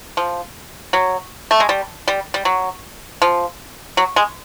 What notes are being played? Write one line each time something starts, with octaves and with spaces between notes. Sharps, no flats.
F3
F#3
A3
G#3
G3
G3
G3
F#3
F3
F#3
G#3